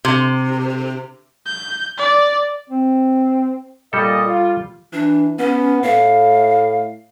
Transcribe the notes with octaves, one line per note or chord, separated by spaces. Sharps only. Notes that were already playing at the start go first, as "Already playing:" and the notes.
C3
G6
D5
C4
A#2 G3 A4 D#5
F4
E3 D4
B3 C#4
A2 F5